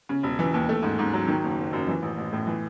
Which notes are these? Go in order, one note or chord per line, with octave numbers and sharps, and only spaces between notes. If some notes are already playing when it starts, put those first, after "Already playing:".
C#3
E1
E3
D#2
A3
G#2
G#2
F#3
D#3
F#1
F#1
F#2
E3
A1
A1
A2
E3